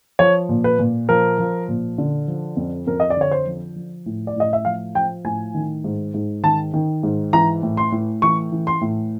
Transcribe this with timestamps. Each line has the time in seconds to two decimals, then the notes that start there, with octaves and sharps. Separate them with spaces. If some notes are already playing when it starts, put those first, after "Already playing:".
0.19 F3 C#5
0.49 A#2
0.64 B4
0.79 A#2
1.09 F3 A#4
1.39 F3
1.68 A#2
1.98 D3
2.28 F3
2.57 F2
2.87 F2 A#4
3.00 D#5
3.10 D5
3.17 D3 C#5
3.31 C5
3.47 F3
3.76 F3
4.06 A2
4.27 D5
4.36 A2 D#5
4.53 E5
4.65 F3 F5
4.95 F3 G5
5.25 A2 G#5
5.54 D#3
5.84 G#2
6.14 G#2
6.43 D#3 A5
6.74 D#3
7.03 G#2
7.33 E3 A#5
7.63 A2
7.77 C6
7.92 A2
8.22 E3 C#6
8.52 E3
8.67 C6
8.81 A2